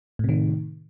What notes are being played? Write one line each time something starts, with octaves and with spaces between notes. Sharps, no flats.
A2 C3 D#3